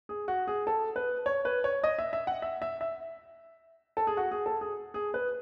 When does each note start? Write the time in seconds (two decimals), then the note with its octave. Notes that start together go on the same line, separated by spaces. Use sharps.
0.09 G#4
0.28 F#4
0.48 G#4
0.67 A4
0.96 B4
1.26 C#5
1.45 B4
1.64 C#5
1.84 D#5
1.99 E5
2.13 E5
2.27 F#5
2.42 E5
2.62 E5
2.81 E5
3.97 A4
4.07 G#4
4.17 F#4
4.31 G#4
4.46 A4
4.61 G#4
4.94 G#4
5.14 B4